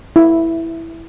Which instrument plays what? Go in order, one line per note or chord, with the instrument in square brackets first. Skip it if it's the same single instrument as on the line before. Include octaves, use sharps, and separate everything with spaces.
[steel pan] E4